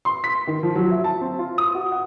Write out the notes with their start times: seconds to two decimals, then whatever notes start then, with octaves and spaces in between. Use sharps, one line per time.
0.05 C6
0.24 B6
0.47 D#3
0.63 F3
0.75 F#3
0.91 E5
1.04 A5
1.21 C4
1.39 F4
1.58 D#6
1.75 F#4
1.92 F#5